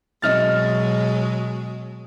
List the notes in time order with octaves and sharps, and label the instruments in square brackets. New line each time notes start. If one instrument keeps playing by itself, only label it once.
[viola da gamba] B2 F#3 G#3 [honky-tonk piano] D#5 F6 A6